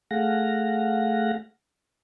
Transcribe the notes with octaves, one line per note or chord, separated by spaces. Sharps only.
A3 G#4 F5 F#5 A#6